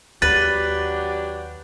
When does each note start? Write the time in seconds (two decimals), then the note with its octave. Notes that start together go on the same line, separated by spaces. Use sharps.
0.22 D#2 F#3 D4 G4 B4 A6